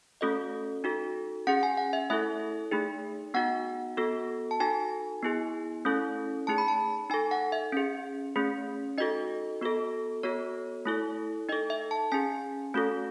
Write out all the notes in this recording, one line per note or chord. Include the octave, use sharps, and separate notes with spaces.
A3 C#4 F#4 A4 D#5
D#4 F#4 A4
C#4 G#4 F#5
G#5
F#5
E5
A3 E4 A4 E5
A3 D#4 G#4
B3 D#4 F#4 F#5
B3 F#4 A4
A5
D#4 F#4 A4 G#5
B3 E4 G#4
A3 C#4 E4 A4
A3 D#4 G#4 A5
B5
A5
D#4 A4 G#5
F#5
E5
C#4 G#4
A3 C#4 G#4
D#4 F#4 A4 D#5
B3 F#4 A4
B3 F#4 A4 C#5
A3 E4 A4
D#4 A4 D#5
E5
A5
C#4 G#4 G#5
A3 C#4 F#4 A4